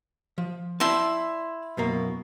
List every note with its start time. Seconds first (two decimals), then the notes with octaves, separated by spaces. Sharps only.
0.38 F3
0.80 E4 D5 G5 A5 C6
1.77 F#2 B2 A#3